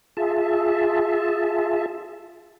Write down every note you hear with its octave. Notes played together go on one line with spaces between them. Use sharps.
F4 G#4 E5 A5